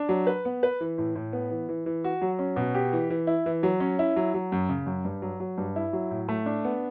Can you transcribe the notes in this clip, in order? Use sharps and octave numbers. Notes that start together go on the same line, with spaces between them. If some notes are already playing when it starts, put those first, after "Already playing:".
Already playing: D4
F#3
B4
B3
B4
E3
A2
A2
B3
E3
E3
E3
F#4
F#3
C#4
B2
G4
E3
E3
E4
E3
F#3
C#4
E4
F#3
F#3
F#2
C#3
F#2
G2
F#3
F#3
G2
E4
F#3
A2
A3
D4
B3